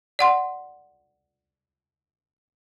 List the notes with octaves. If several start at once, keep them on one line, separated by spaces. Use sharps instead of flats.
D5 F#5 C6